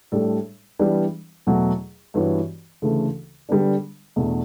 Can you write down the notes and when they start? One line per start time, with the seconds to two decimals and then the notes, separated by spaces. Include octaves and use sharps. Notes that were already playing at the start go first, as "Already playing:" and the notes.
0.12 A2 G3 D4 A4
0.79 E3 G3 B3 D4
1.47 E2 B2 F#3 A3
2.14 G2 E3 B3 F#4 C#5
2.82 D2 C#3 E3 A3 E4
3.49 D3 G3 B3 D4
4.16 E2 B2 A3 D4